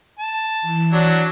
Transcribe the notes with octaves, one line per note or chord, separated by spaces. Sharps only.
A5
E3
F#3 D4